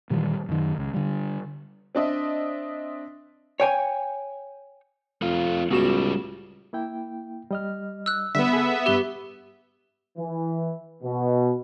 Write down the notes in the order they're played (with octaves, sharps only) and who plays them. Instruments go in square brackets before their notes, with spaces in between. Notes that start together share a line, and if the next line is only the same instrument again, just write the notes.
[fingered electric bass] A#2 D#3 E3 G3
F#2 D#3
C#2
D3 G3
[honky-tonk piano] C4 D4 D#5 E5
[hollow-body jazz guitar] C#5 G5 G#5
[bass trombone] F2 [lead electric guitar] A3 F4
[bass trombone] C#2 [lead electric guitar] A2 G3 [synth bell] B3 F#4 E7
[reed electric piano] A#3 E4 G5
G3 D#5 F6
[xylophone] E6 F#6
[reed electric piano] D3 G3 [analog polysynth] B3 E5 [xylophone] B6
[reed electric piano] G#4 A4
[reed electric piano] G2 B4 [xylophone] G4 G7
[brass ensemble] E3
B2